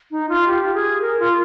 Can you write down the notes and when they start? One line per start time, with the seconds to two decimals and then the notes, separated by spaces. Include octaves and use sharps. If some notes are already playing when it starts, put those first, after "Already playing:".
0.11 D#4
0.29 F4
0.47 G4
0.74 G#4
1.01 A#4
1.19 F4